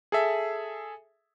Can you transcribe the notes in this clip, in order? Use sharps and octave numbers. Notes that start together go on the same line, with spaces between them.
G#4 A4 E5